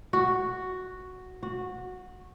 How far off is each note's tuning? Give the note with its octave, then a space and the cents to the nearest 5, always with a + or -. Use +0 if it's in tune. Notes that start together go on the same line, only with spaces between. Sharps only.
F#4 +0
F#4 -15